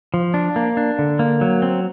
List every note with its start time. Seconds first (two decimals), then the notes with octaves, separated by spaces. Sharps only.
0.14 F3
0.34 D4
0.56 A#3
0.77 D4
0.99 D3
1.19 A#3
1.41 F#3
1.62 C4